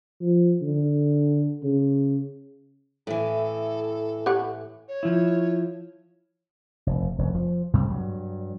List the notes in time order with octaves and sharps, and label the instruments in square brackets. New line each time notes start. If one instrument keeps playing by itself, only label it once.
[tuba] F3
D3
C#3
[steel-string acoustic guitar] A2 E3 [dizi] A4
[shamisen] G4 C#5 F#5
[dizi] C#5
[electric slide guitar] F3 E4
[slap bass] F1
F1 F#2
F3
G#2 C3 G3 G#3
G2 F#3